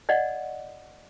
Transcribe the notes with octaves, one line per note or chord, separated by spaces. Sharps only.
D5 D#5 F#5